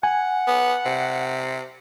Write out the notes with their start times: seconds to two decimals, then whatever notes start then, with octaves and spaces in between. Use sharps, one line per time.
0.03 F#5 G#5
0.47 B3
0.85 C3